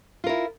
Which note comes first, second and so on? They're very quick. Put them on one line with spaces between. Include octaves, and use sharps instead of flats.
F4 A#4 E4